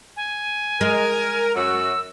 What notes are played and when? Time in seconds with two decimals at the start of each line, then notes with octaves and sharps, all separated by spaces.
0.17 G#5
0.81 G#3 A#4
1.55 F#2 F#4 E6